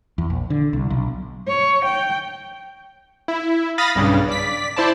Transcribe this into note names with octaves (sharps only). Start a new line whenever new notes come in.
E2
A#1
D3
C2
B1
C#5
G5
E4
F5 B5 D#6 A6 A#6
B1 G2 C#3
D5 B6
E4 C5 D5 A5